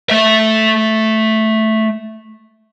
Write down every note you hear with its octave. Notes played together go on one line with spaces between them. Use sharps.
A3 E5